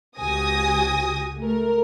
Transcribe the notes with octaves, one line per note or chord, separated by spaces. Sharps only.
C#2 F#4 G4 G#5 D#6 A#6
A3 A#4